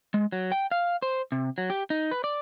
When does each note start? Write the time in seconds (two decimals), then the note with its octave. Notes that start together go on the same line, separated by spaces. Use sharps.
0.14 G#3
0.32 F#3
0.52 G5
0.71 F5
1.02 C5
1.32 C3
1.58 F#3
1.70 G4
1.90 D#4
2.11 B4
2.24 D5